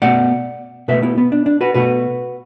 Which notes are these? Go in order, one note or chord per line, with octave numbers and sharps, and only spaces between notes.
B2 A3 D5 F#5
B2 A3 B4 E5
B3 E4
B3
D4
D4
F#4 B4
B2 A3 F#4 B4